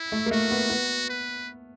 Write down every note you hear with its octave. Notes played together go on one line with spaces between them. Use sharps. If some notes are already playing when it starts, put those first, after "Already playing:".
Already playing: E4
A3
A#3
A3 F#4
B3
B3
B4